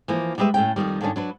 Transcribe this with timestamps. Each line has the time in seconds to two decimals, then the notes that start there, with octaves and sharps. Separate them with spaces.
0.08 E3 F3 A#3
0.38 G3 G#3 G4 B4 E5
0.54 A2 A3 C#4 G5
0.76 F2 A2 D#3 G3
1.01 G2 D3 D#3 C#4 D4
1.16 F#3 D4 B4